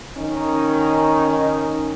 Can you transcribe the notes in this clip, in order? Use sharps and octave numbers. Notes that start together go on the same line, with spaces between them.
D#3 C#4 D#4